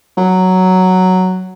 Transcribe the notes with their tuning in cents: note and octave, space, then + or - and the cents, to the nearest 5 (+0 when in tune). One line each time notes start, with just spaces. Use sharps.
F#3 +5